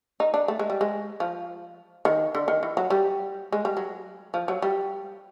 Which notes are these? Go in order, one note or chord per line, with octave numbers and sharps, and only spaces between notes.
D#4
D4
A3
G#3
G3
G#3
F3
D#3
D3
D#3
E3
F#3
G3
G#3
G3
F#3
F3
F#3
G3